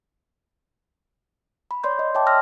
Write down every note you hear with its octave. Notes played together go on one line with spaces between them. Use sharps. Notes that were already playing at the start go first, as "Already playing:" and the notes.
B5
C#5 D5 C6 G6
D#5
C#5 E5 G5 A5 D6
C6 E6 F6 A#6